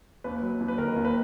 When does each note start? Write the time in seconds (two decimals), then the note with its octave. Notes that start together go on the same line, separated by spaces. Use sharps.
0.24 D#2 B4
0.42 F#3
0.60 D#2
0.68 B4
0.78 D#3 A#4
0.96 D#2
1.05 B4